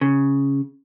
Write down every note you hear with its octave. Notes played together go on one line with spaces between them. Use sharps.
C#3